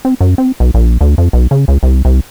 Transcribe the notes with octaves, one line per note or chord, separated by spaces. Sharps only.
C4
F#2
C4
B1
A#1
D2
F2
B1
C#3
C#2
C2
C2